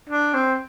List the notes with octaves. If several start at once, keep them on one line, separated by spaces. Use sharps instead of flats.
D4
C4